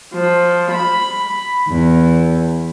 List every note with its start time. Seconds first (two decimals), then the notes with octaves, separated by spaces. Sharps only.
0.15 F3
0.71 B5
1.68 E2